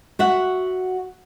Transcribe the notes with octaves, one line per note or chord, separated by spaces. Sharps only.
F#4 E5 F#5